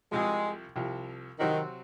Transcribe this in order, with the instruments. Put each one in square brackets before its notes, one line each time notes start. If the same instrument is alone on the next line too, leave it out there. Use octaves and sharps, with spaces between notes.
[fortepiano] C2 C3 F3 [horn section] G#3
[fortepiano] C2 C3 F3
[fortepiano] C3 F#3 C4 F#4 [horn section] D#3